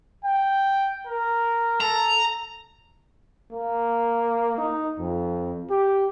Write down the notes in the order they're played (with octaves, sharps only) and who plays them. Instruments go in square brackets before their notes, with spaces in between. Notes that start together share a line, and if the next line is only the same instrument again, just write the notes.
[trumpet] G5
A#4
[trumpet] A4 [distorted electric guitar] A#5
[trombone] A#3
D#4
F2
G4